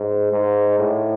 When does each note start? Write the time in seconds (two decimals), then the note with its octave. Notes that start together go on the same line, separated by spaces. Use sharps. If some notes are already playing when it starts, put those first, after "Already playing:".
Already playing: G#2
0.33 G#2
0.79 A2